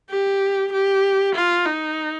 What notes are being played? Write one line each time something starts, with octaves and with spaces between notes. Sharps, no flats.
G4
G4
F4
D#4